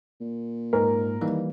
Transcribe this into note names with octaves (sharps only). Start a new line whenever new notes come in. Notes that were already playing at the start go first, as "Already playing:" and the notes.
A#2
G#2 A#4
D#3 E3 G3 A#3